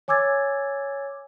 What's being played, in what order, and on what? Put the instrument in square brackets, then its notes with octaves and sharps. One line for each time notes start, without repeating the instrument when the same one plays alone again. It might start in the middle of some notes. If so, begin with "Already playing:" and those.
[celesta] C#5 G#5 D6 E6 G#6 A6